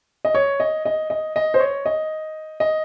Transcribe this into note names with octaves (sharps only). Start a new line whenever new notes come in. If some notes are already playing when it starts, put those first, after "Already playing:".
D#5
C#5
D#5
D#5
D#5
D#5
C5
C#5
D#5
D#5